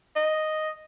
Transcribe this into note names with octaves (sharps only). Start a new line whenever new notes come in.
D#5